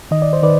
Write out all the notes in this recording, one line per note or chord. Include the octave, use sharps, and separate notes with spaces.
D#3 D#5
D5
C5
D#3 B4 D5